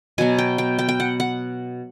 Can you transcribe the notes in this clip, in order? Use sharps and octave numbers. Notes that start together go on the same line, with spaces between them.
B2 F#3 B3 G#5
G5
G5
G5
G5
F#5
F#5